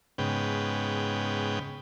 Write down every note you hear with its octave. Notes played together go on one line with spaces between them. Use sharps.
G#2 C#3 B3 G5